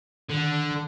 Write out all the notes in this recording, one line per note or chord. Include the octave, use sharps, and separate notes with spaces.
D3 D#3
D#3